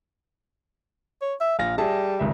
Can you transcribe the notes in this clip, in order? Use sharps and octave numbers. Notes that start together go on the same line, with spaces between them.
C#5
E5
A#1 F5 A#6
G3 G#4 E5 A5
G#1 C#2 E5